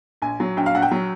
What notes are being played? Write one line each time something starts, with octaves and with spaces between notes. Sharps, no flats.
A#1 G#5
F#3
A#1 G5
F5
A#1 F#5
G5
F#3